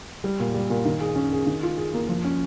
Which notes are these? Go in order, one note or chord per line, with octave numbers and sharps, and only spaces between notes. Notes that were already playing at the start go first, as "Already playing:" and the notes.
G3
A#2
G3
A#2
D#3
G#4
C#4
G#4
D#3
F4
G#4
A#3
F3
C#4